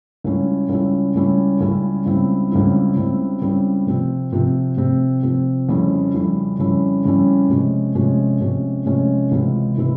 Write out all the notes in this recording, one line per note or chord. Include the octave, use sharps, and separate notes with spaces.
C#2 C#3 G3 C#4 E4
C#2 C#3 G3 C#4 E4
C#2 C#3 G3 C#4 E4
C#2 C#3 G3 C#4 E4
C#2 C#3 G3 C4 E4
C#2 C#3 G3 C4 E4
C#2 C#3 G3 C4 E4
C#2 C#3 G3 C4 E4
C3 F3 C4
C3 F3 C4
C3 F3 C4
C3 F3 C4
F2 C#3 G3 C#4 E4
F2 C#3 G3 C#4 E4
F2 C#3 G3 C#4 E4
F2 C#3 G3 C#4 E4
C3 F3 G#3 C#4
C3 F3 G#3 C#4
C3 F3 G#3 C#4
C3 F3 G#3 C#4
C#2 C3 E3 G#3 E4
C3 E3 G#3 E4